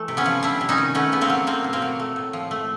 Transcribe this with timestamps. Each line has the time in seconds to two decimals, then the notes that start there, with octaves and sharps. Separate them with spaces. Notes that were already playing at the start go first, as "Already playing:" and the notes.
Already playing: E3 A3
0.08 C3
0.17 B3 C#4
0.26 F3
0.43 G3 D4 E4
0.61 C3
0.69 C#4 D#4
0.78 D#3
0.95 A3 B3 C#4
1.12 C#3 B3
1.21 A#3 C4
1.30 F#3
1.47 A3 A#3 C4
1.64 B2
1.73 A#3 C4
1.82 F#3
2.00 A3
2.16 A2
2.33 F3
2.51 A3